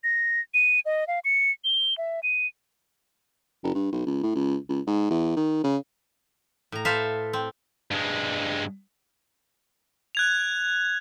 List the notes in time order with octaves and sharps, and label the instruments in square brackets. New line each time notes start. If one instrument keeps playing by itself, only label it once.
[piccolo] A#6
D#7
D#5
F5
C#7
G7
E5
D#7
[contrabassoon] F#1
G2
B1
C#2
A2
C#2
C#2
G#2
E2
D#3
C#3
[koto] A2 A#5
A4 B4 C5 E5 F5
C4
[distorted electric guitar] G2 G#3
[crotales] F#6 G#6 F7